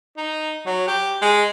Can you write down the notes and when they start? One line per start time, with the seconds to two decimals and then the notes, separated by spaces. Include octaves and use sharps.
0.17 D#4
0.66 F#3
0.87 G4
1.22 G#3